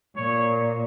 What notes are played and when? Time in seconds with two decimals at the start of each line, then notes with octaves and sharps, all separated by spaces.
0.17 A#2 C#5